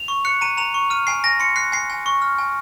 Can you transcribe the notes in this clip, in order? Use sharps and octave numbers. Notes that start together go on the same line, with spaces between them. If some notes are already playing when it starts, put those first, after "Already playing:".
Already playing: F7
C#6
F#6 C#7
A#5 D#7
A#5 F7
C#6
F6 D#7
G#5 C7
G#5 A#6
C6 C#7
F#6 C7
G#5 C7
G#5
C#6
F6
G#5